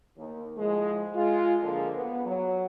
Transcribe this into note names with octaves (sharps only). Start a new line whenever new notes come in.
D#2
A2 F3 G#3
G#3 F4
D3 F3 A#3 G#4 A4
B3
F#3